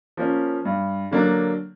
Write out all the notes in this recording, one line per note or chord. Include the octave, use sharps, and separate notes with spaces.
F3 A#3 C#4
G2
D3 F#3 A#3 D4